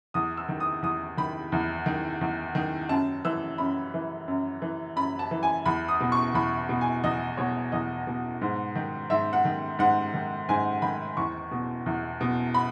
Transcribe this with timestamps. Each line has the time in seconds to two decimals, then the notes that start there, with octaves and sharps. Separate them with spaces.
0.14 E2 D#6
0.37 E6
0.49 D#3
0.60 D#6
0.83 E2 D#6
1.17 D#3 B5
1.52 E2
1.86 D#3
2.21 E2
2.55 D#3
2.89 F#2 A5
3.25 E3 E6
3.58 F#2 B5
3.94 E3
4.28 F#2
4.62 E3
4.96 F#2 B5
5.19 A5
5.31 E3
5.43 G#5
5.66 E2 B5
5.88 D#6
6.00 B2
6.12 C#6
6.34 E2 B5
6.69 B2
6.81 G#5
7.04 E2 D#5
7.37 B2 C#5
7.72 E2 D#5
8.07 B2
8.41 G#2
8.75 D#3
9.10 G#2 E5
9.33 F#5
9.45 D#3
9.79 G#2 F#5
10.14 D#3
10.49 G#2 G#5
10.82 D#3 B5
11.17 E2 C#6
11.51 B2
11.86 E2
12.21 B2
12.54 B5